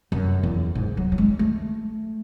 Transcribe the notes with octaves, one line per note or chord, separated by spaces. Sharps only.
F#2
E2
G#2
F#3
F#3
G#3
A3